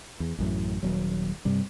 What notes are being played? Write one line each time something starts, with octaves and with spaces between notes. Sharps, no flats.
E2
A1 F#2 A2
D#1 F#3
G2 C3 G3